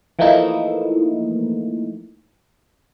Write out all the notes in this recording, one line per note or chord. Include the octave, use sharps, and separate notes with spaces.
E3 F3 A3 A#3 D#4 E4